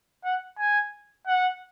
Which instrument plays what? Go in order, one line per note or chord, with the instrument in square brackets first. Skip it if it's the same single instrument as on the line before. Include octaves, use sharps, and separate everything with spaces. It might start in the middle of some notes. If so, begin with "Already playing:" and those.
[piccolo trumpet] F#5
G#5
F#5